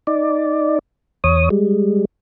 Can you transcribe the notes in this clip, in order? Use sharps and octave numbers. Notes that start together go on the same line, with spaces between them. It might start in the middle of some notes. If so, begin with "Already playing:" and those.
D#4 D5
E2 C#5 D#6
G3 G#3